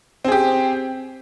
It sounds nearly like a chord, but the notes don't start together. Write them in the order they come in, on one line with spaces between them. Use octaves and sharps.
C4 G#4 G4